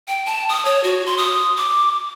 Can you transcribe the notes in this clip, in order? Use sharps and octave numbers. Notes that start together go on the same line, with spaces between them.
G5
A5
D#6
C#5
F#4
C6
D#6
D6